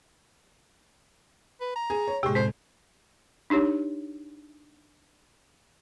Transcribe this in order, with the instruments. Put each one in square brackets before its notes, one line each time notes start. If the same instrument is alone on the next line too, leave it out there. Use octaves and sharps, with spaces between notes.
[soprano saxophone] B4
A#5
[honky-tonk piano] G#4
C#5
[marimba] A2 C3 [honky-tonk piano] G#3 G4
[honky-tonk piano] F2 [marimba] G#3 [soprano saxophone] C5
[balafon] D4 D#4 G4 C#5